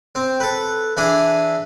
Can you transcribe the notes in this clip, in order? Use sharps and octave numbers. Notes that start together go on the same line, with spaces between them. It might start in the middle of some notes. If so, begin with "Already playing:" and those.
C4
A4 B4
E3 D4 G#4 E5 D#6